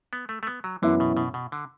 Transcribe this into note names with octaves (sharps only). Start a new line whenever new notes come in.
B3
A3
A3
B3
F#3
F#2 D3 E3 B3 E4
B2
B2
B2
D3